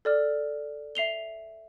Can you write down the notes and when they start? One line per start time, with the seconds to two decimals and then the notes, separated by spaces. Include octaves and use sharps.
0.05 A4 D5 F6
0.95 E5 C7 F7 G7